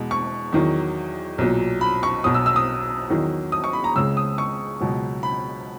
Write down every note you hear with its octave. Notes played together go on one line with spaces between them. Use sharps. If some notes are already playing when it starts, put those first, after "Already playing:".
Already playing: E2 B2 G#3
C#6
E2 D#3 F#3
B1 A#2 F#3
B5
C#6
B1 B2 F#3 D#6
E6
E6
D#6
E2 D#3 F#3
D#6
C#6
B5
A#5
C#2 C#3 G#3 E6
D#6
C#6
C#2 B2 F#3
B5